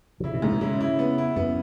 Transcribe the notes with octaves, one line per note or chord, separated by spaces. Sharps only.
E3
C#3 E4
B2
G#2 C#3
B2
C#3 E4
E4
B3
E4
F#2 B3